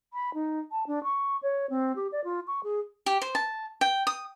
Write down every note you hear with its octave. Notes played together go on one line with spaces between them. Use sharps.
B5
D#4
A5
D4
C#6
C#5
C4
G4
D5
F4
C#6
G#4
G4
C5
A5
G5
D#6